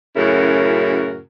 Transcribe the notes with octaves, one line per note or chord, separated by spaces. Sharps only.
F#2 A2 C#3 E4 F#4 A#4